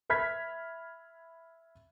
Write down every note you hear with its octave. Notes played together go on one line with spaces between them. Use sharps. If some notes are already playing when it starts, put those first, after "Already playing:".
E5 B5 F6 G#6 B6